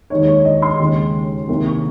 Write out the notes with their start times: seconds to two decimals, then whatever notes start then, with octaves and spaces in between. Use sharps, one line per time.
0.10 D#2 D#3 G#3 D#4 C#5
0.27 C#5
0.45 D#5
0.62 C6
0.79 D#2 C#3 G#3
1.48 C2 C3 D#3 A#3
1.66 C#6